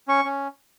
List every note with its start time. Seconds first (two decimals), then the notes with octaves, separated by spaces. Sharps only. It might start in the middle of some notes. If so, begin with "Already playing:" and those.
0.08 C#4 C#6
0.25 C#4